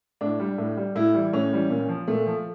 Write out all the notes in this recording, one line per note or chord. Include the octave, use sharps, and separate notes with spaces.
A2 D4
G3
A2
G3
A2 E4
E3 G3
A2 C#4
E3 G3
A#2
F3
A#2 A3
F3